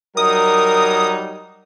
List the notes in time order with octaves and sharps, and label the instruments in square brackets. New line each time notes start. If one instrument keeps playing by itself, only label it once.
[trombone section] F#3 G3 D#4 [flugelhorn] A#4 [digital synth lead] D#6